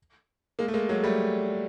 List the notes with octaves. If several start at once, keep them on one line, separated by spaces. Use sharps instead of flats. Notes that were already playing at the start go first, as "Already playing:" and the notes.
G#3 A#3
A3
G#3 A#3
F#3 G#3
G3 A3